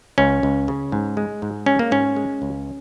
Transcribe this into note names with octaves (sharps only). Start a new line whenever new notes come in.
C#2 C#4
C#2
C#3
G#2
G#3
G#2
G#3 C#4
A#3
G#2 C#4
G#3
C#2